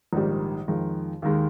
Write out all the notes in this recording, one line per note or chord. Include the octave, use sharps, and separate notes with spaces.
A#1 G#2 D#3 G3
F2 D#3 G#3
D#2 D#3 G#3